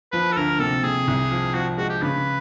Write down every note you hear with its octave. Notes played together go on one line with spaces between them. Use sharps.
F3 B4
A4
D2 A#4
C3 A4
C3 G#4
C2
F3
F3 F#4
G#3 F#4
G4
C#3 B4